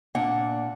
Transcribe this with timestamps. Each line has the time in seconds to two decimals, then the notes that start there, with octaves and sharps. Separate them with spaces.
0.15 A#2 A#3 D4 F#5